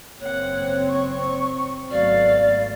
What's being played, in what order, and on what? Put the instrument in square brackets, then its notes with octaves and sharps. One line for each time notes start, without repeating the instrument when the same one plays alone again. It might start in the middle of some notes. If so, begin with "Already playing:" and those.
[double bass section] F#1 C4 [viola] A#3 F#5 [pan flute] C#5
[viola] C#6
[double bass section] G#1 A3 B3 [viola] F#3 F5 [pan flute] D5